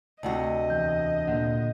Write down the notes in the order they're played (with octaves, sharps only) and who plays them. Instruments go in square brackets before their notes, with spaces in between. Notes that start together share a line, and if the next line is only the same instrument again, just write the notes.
[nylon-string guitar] D2 C3 F#4 [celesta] D5 F#5 [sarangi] D#5
[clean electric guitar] E2 [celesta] G6
[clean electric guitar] A#2 D3 D4 [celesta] F#5 G6